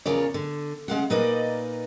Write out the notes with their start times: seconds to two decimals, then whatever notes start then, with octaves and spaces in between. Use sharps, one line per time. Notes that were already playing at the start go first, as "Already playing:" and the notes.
0.06 E2 C#3 F4 A#4 C#5 D5
0.34 D3
0.88 C#3 G#3 F5 F#5
1.10 A#2 A#3 D#4 B4 D5 D#5